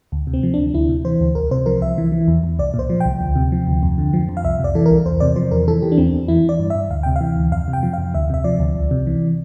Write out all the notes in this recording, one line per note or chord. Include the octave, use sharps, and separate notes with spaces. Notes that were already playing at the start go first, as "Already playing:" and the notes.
D2
C3
C4
F3
D2 D4
D2 E4
C3
E3 C5
D2
C2 A#4
C3 C5
F3 A#4
C2 E5
E3
E3
E2
E2
C2 D5
A#2
C5
F3
G5
C2
D2
C3
F3
D2
F2
D3
F3
F2
F5
C2 E5
C3 D5
E3 A4
A#4
C2
E2 C5
C3 D5
F3 C5
E2 A#4
E3 A4
E3 G4
D4
E2 C4
E2
E3 E4
E3 D5
G2
G2 E5
D2 F5
C3 G5
F5
E3
D2
F2 F5
C3
G5
F3
F2 F5
D2 E5
C3 E5
F3 D5
D2
C2
C3
E3